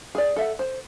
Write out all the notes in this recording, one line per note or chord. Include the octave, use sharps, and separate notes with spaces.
G#4 D5
A4 E5 F#5
C5